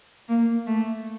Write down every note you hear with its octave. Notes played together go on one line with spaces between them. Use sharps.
A#3
A3